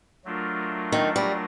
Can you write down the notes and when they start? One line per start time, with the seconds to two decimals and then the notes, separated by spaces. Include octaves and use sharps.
0.25 F#3 A3 D4 F4 A#4
0.92 D#3
1.16 G3